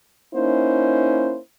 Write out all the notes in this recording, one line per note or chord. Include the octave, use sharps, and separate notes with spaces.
A#3 C#4 D#4 E4 C5